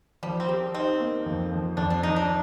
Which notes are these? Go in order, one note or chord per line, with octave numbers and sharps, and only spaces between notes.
F3 G3
C4
A#3 G4
C4 D#4
A#3
F2
F3
F2 D4
D4
F3 D#4
D4